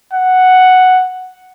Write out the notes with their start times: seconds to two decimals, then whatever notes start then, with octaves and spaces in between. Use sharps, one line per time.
0.13 F#5